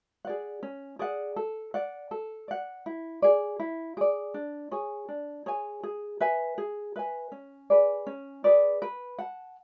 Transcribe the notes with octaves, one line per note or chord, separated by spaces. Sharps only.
G#4 D5 F#5
C#4
G#4 D5 F#5
A4
D5 F#5
A4
D5 F#5
E4
G#4 D5
E4
G#4 D5
D4
G#4 C#5 G#5
D4
G#4 C#5 G#5
G#4
B4 E5 G#5
G#4
B4 E5 G#5
C#4
G#4 B4 D5
C#4
G#4 B4 D5
B4
F#5 A5